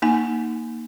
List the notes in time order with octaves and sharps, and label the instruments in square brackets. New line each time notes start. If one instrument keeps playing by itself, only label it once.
[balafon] A#3 D#4 G#5